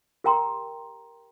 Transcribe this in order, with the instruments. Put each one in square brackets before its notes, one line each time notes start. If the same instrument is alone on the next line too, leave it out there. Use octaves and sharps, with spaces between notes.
[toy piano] G4 A#4 G5 A#5 C6